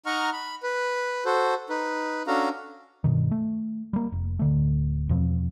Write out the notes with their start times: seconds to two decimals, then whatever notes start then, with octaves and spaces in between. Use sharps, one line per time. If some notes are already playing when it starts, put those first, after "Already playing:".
0.06 D#4 D#5 F#5 A#5 C#6 F6
0.33 B5
0.63 B4
1.25 F#4 A4 C5
1.70 D#4 B4
2.27 C#4 D4 F#4 A4 F5 A#5
3.04 G2 B2 D#3
3.31 A3
3.93 G3 A#3
4.12 F1
4.39 D1 D3 A3
5.09 E2 B2 F3 C4